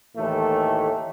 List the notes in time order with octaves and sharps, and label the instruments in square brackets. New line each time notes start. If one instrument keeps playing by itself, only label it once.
[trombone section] D#2 A2 E3 A3 A4